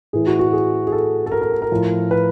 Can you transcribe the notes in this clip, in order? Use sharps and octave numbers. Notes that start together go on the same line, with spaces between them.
A2 E3 G#4
F#4
F#4
G#4
G#4
A4
A4
A#4
A#4
A4
A#4
A2 F3
B4